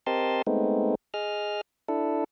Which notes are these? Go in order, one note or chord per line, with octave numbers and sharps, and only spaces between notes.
C4 G4 A#4 D#5 A5 C6
G#3 A3 B3 C4 D#4
G#4 D#5 F6
D4 E4 A4